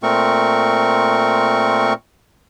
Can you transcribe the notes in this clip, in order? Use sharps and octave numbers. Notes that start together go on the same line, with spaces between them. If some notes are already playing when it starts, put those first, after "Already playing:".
A#2 A3 C4 A#4 C#6